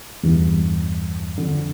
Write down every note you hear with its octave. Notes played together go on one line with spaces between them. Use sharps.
E2 G2
F2 D3